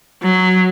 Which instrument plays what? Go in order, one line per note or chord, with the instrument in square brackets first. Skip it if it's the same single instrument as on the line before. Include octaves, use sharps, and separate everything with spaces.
[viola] F#3